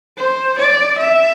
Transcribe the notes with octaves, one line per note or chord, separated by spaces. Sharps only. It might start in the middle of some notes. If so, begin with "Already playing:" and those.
C5
D5
E5